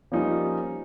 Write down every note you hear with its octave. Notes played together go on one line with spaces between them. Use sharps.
F3 G3 A#3 C#4 D#4 F4